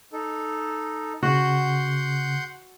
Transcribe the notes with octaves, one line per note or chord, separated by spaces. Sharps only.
D#4 A4
C#3 F#4 F#5 C6 G6